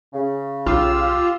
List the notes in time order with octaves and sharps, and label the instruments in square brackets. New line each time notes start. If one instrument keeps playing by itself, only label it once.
[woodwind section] C#3
[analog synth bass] B1 [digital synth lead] F4 [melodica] G4 E6